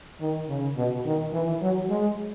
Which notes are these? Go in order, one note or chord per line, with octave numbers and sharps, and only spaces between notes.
D#3
C#3
B2
D#3
E3
F#3
G#3